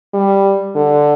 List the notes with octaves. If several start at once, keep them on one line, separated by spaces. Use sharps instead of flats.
G3
D3